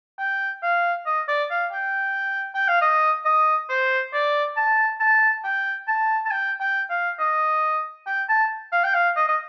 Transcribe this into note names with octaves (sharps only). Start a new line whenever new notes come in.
G5
F5
D#5
D5
F5
G5
G5
F5
D#5
D#5
C5
D5
A5
A5
G5
A5
A5
G5
G5
F5
D#5
G5
A5
F5
G5
F5
D#5
D#5